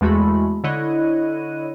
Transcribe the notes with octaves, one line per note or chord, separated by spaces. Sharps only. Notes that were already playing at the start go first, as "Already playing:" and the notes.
E2 G#3 A3 F#4 B5
D3 E4 C#5 D#5 F#6 D#7